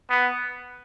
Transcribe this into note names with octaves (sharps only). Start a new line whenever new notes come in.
B3